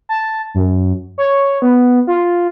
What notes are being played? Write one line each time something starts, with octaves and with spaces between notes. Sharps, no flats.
A5
F#2
C#5
B3
F4